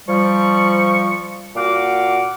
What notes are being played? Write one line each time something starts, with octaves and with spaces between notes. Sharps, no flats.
F3 G3 C#6
A#2 F#4 F5 F#5 D6